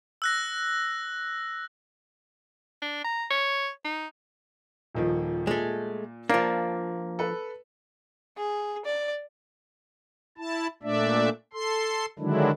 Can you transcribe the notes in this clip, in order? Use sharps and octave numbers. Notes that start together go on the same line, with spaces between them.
E6 F#6 A#6
D4
A#5
C#5
D#4
D#1 D#3 F3
A#2 G#3 A3
F3 A#3 D4
A4 B4
G#4
D5
E4 A5
A#2 A3 D4 D5 E5
A4 C6
D3 D#3 F#3 G#3 D4 E4